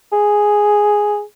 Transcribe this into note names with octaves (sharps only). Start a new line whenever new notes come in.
G#4